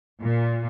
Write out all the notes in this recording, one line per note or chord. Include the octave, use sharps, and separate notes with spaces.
A#2